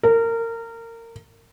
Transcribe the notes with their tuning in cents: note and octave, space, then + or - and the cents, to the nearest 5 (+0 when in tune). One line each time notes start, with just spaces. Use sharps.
A#4 -25